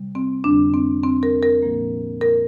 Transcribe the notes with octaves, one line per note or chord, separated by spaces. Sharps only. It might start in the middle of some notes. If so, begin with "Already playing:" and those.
Already playing: C3 G3
C4
F2 D3 G3 D4
C4
C4
A#4
A#4
A#2 F3 A#3
A#4